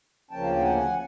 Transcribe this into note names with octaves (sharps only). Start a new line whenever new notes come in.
D2 C#3 F3 A#3 C#4 G5 A5
F#5 G#5